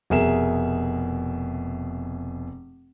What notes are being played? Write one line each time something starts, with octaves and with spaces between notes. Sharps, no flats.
F1 B2 G#4 A#4 E5 E7